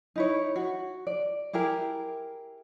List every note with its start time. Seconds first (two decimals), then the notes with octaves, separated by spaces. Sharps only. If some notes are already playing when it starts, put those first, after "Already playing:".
0.16 D#4 E4 C#5
0.56 F#4
1.07 D5
1.53 E4 G4 G#4 A#4